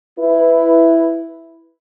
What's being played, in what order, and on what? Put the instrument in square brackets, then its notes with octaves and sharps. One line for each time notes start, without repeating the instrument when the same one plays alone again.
[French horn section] E4 B4